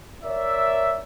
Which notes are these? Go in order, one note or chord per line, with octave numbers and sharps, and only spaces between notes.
A#4 C#5 D5 E5